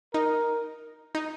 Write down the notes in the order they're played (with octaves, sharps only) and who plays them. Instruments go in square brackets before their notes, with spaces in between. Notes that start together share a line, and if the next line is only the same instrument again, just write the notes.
[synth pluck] D#4 [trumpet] A#4
[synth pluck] D#4